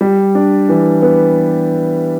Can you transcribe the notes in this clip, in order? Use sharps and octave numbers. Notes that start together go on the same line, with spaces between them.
G3
D4
E3
B3